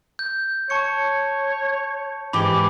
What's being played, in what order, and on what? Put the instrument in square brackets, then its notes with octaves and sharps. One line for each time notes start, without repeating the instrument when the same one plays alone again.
[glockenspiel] G6
[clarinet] C#5 [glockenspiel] A5 C#6 C#7
[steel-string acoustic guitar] G#2 E3 G4 [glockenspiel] B5 G7 [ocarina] D6